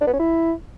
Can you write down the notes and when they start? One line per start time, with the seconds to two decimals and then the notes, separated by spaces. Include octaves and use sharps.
0.01 D4
0.07 B3
0.13 C#4
0.19 E4